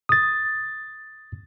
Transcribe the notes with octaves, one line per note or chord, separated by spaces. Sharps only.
D#6 A6